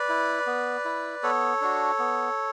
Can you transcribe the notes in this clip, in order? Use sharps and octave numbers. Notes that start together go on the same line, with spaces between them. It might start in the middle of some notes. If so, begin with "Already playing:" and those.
Already playing: B4 D5
E4
B3
E4
B3 A4 C#5
D4 F#4
B3